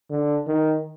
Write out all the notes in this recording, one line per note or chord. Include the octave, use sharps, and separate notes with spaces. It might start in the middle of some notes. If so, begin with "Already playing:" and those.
D3
D#3